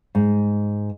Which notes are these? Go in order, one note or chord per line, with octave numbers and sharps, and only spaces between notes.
G#2